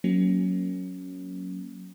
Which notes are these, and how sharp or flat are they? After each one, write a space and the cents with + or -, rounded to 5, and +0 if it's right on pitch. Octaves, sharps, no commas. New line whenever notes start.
F#3 -5 A#3 +5 C#4 +0